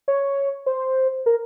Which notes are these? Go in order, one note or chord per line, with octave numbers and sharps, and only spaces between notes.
C#5
C5
A#4